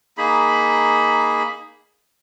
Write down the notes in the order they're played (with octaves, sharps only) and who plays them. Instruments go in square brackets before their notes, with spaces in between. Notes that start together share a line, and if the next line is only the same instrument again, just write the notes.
[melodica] A#3 D#4 G#4 B5